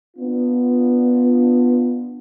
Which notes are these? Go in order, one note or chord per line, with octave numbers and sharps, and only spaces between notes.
B3 D4 F4